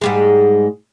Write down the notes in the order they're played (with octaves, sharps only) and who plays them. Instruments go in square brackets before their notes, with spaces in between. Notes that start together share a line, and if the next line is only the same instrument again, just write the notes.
[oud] G#2 G3 G#3